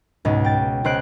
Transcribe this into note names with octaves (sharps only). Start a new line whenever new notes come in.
C#2 G#2 B2
G5 A6
C#2 C5 F#6 D7